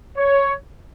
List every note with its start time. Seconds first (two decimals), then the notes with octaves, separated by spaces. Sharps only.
0.17 C#5